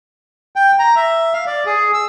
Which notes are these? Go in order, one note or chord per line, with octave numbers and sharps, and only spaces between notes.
G5
A#5
E5
F5
D5
G#4
E6